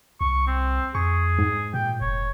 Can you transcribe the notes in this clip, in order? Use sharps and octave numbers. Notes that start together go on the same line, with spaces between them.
C2 C#6
C4
F2 G#4 C#6
G#2
A#2 G5
F1 C#5